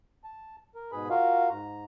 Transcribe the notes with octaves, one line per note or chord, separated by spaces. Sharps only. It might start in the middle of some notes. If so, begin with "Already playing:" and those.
A5
A#4
G#2 B2 G#4 B4 B5
F4 F#4 A#4 F5
G#2 A#5